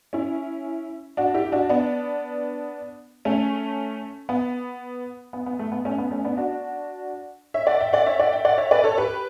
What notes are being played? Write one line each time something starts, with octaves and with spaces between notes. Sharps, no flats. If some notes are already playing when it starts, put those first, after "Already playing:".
C#4 E4
D4 F#4
E4 G4
D4 F#4
B3 D4
A3 C#4
B3
B3
B3
A3
B3
A3 C#4
B3
A3 C#4
B3 D4
D4 F#4
C#5 E5
D5 F#5
E5 G5
D5 F#5
C#5 E5
D5 F#5
E5 G5
D5 F#5
C#5 E5
B4 D5
A4 C#5
G4 B4